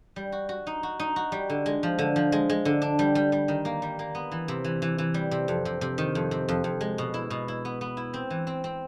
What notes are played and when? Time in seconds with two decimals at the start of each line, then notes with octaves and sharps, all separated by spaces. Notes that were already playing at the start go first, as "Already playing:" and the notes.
0.16 G3
0.32 F#4
0.49 F#4
0.67 D#4
0.83 F#4
1.00 D#4
1.16 F#4
1.32 G3
1.50 D3
1.66 G#3
1.83 F3
1.99 D3
2.16 F3
2.32 G#3
2.50 G#3
2.65 D3
2.82 D4
2.99 G3
3.15 G3
3.32 G3
3.48 D#3
3.65 A#3
3.82 G3
3.99 A#3
4.15 B3
4.32 E3
4.48 C3
4.64 E3
4.82 E3
4.98 E3
5.14 G3
5.31 C3
5.48 F2
5.65 C3
5.81 C3
5.98 D#3
6.15 F2
6.31 C3
6.48 F2
6.64 F2
6.81 G#3
6.98 B2
7.14 E4
7.30 B2
7.48 E4
7.65 B3
7.81 B3
7.97 E4
8.14 C4
8.30 E3
8.47 C4
8.64 C4